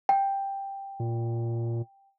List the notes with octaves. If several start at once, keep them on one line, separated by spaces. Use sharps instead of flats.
G5
A#2